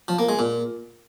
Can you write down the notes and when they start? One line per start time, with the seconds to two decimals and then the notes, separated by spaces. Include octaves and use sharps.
0.08 F3
0.19 A#3
0.29 G#3
0.39 A#2